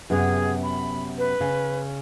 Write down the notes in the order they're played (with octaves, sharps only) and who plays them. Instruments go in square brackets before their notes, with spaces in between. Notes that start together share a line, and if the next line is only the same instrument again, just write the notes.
[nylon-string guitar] F#2 C3 B3 [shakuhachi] G#4
[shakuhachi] B5
B4
[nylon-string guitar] C#3